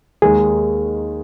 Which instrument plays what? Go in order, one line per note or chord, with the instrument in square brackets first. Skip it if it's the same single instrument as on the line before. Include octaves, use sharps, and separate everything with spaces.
[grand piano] D#2 D#3 G#3 [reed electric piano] G#4